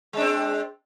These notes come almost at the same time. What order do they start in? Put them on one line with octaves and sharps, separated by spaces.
G#3 D4 C4